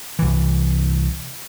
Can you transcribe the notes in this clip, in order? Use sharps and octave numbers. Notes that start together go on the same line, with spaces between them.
C2 E3